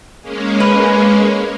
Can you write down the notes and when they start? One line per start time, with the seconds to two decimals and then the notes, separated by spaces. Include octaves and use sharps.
0.22 G#3 A#3 C#4
0.60 B4